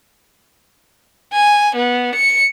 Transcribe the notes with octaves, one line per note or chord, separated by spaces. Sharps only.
G#5
B3
C#7